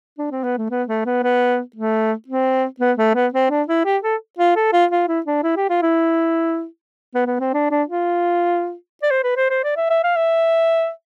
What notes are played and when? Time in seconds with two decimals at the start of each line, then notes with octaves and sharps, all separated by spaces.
0.18 D4
0.31 C4
0.44 B3
0.58 A3
0.71 B3
0.88 A3
1.06 B3
1.23 B3
1.76 A3
2.28 C4
2.80 B3
2.98 A3
3.15 B3
3.34 C4
3.50 D4
3.68 E4
3.85 G4
4.03 A4
4.38 F4
4.56 A4
4.73 F4
4.91 F4
5.08 E4
5.26 D4
5.43 E4
5.56 G4
5.69 F4
5.82 E4
7.15 B3
7.27 B3
7.40 C4
7.54 D4
7.71 D4
7.88 F4
9.03 D5
9.11 C5
9.23 B4
9.37 C5
9.50 C5
9.64 D5
9.77 E5
9.90 E5
10.03 F5
10.16 E5